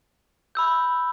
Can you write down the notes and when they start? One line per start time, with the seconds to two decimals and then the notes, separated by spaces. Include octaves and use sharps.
0.55 B5 E6 G6